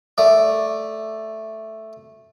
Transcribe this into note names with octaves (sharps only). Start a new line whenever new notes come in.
A3 D5